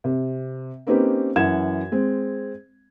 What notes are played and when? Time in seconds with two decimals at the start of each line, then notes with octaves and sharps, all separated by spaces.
0.04 C3
0.87 A#3 C4 C#4 D#4 G4 B4
1.36 F#2 E3 F#5 G#6 E7
1.92 G#3 C4